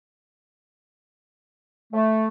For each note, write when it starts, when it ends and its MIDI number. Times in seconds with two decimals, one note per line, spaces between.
1.93 2.28 57